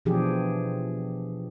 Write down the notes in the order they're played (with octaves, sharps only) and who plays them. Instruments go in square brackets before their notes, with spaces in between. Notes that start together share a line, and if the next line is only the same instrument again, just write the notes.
[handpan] B2 E3 F3 D4 G4 G#4